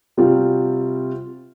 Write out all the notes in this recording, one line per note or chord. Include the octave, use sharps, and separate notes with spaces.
C3 G3 C4 F4 F#4